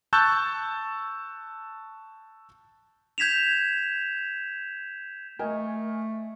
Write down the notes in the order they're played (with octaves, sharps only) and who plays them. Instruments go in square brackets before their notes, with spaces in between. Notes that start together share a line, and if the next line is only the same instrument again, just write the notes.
[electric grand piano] A5 C#6 E6 F#6 G6 A6
[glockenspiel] G6 G#6 B6 E7 F7
[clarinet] A3 [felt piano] A#4 D#5 G#5